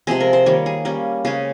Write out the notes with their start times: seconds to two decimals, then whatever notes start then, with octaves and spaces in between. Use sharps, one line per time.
0.07 C3 F3 G#3 C4 G#4
0.20 A#4
0.33 C5
0.46 D#3 G3 A#3 C#5
0.66 G#4
0.85 G3 A#3 C#4
1.25 C#3 G#3 C#4 G#4